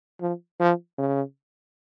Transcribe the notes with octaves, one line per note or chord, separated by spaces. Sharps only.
F3
F3
C#3